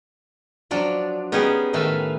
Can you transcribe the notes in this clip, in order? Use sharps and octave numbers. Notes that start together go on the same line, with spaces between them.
F3 F#3 D4
B3 C#4 D#4 G4 G#4
A2 D#3 A3 B4 E5 F5